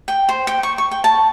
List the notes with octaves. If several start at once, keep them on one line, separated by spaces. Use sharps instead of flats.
G5
C5
G5
C#6
C#6
G5
A5